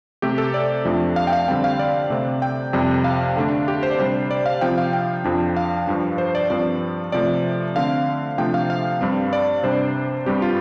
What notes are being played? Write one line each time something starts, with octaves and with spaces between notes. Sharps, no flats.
C3 A3 C4 G4
A4
D5
F2 F3 A3 D4
F5
G5
F5
D3 G3 C4 G5
F5
D5
C3 A3 C4
G5
F2 C3 G3 C4
F5
D3 A3 D4
G4
C5
D5
C3 G3 D4 C5
D5
F5
C3 F3 C4 G5
F5
G5
F2 F3 D4
F5
G2 F3 D4
C5
D5
G2 F3 C4 D5
C3 F3 A3 D5
D3 A3 C4 F5
C3 F3 A3 D4 G5
F5
F5
G2 G3 C4
D5
C3 G3 D4 C5
G2 G3 C4 G4
F4